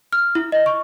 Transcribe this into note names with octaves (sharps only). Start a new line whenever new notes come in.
F6
E4
D#5
C#6